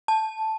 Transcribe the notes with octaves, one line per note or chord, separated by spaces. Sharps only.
A5